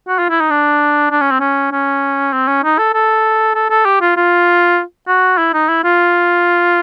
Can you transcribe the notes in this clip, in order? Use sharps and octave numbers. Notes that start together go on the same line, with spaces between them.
F#4
F4
E4
D#4
D4
D4
C#4
C4
C#4
C#4
C4
C#4
D#4
A4
A4
A4
A4
G4
F4
F4
F#4
E4
D#4
E4
F4